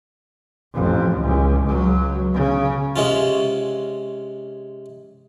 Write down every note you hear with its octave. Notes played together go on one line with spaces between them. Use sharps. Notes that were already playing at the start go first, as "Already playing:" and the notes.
A1 F2
C#2
C#2 F#3
C#3
C3 G#3 C#4 F4